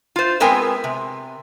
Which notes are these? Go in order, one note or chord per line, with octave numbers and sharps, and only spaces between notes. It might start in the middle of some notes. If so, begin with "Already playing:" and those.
F4 C5
G#3 B3 C4 A#4 G5 G#5
C3